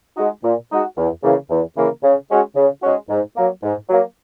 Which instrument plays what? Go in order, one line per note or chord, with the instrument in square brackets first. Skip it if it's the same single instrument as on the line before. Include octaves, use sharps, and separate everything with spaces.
[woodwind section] G#3 D#4 F#4
A#2
G#3 D#4 F#4
E2
C#3 E3 A#3
E2
C#3 E3 A#3
C#3
G#3 C#4 F#4
C#3
G#3 C#4 F#4
G#2
F#3 A#3
G#2
F#3 A#3